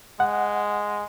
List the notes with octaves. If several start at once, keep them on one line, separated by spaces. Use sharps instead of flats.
G#3 F#5